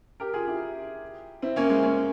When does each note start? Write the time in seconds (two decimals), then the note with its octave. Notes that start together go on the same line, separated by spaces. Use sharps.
0.20 G4 A#4
0.34 F4 G#4
0.48 E4 G4
1.42 C4 E4
1.56 A#3 C#4
1.70 G#3 C4
1.83 A#3 C#4